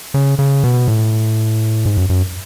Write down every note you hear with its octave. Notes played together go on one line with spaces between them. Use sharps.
C#3
C#3
B2
A2
G#2
F#2
F#2